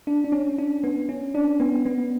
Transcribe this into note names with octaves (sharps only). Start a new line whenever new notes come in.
D4
D4
C#4
D4
B3
C#4
D4
B3
B3